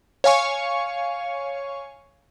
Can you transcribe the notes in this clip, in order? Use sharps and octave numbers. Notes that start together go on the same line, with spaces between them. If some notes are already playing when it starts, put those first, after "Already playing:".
C#5 F5 G#5 C#6 C#7